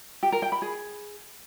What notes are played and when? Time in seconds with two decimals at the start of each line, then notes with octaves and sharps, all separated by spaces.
0.23 G4
0.32 A#4
0.42 G5
0.52 B5
0.62 G#4